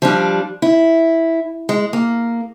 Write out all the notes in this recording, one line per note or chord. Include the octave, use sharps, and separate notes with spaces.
F3 G3 D4
E4
G#3
A#3